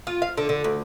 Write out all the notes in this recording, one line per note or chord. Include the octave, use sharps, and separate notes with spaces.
F4
F5
D3
D3
D2